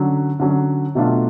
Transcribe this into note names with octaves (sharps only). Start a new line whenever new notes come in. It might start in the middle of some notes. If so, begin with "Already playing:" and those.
Already playing: D3 F#3 C#4
D3 F#3 C#4
B2 F#3 A3 D4 F4